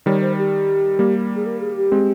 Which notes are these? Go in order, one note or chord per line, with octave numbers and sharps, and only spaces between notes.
D#3 G3 C#5
C5
G4
G3 A#3
G#4
A#4
G#4
G4
G#3 C4